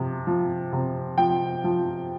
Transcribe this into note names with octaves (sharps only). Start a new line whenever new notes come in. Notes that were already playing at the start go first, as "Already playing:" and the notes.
Already playing: C3 F3
F3
C3
F3 G5
F3